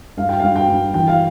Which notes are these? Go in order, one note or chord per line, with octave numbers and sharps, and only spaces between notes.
G2 F5
G5
F5
G2
G5
G2
E3 G5
F5